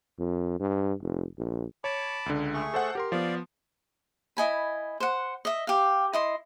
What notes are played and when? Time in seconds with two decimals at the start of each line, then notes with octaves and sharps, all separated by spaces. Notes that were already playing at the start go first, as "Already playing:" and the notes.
0.19 F2
0.60 G2
1.02 F1
1.38 A#1
1.84 C#5 A5 B5 D6
2.26 C#2 D3
2.54 A3 G#4 C#6
2.74 A4 C5 F#5
2.95 G4 A#4 C6
3.12 F3 B3 D5 F5
4.37 E4 D#5 G#5 B5
5.00 C5 F#5
5.45 D#5 E5
5.67 G4 F5
6.13 E4 D#5 C6